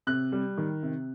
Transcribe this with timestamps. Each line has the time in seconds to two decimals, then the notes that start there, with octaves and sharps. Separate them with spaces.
0.07 C3 F#6
0.32 G3
0.57 D#3
0.83 C3